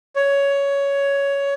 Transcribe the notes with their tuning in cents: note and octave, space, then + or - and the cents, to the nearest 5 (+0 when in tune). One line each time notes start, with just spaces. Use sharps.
C#5 +10